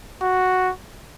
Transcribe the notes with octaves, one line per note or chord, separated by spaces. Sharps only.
F#4